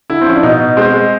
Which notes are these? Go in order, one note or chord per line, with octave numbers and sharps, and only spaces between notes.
D3 E4
C4
F3 C#4
D4
B2 D#4
B2
G#3 C4
G#3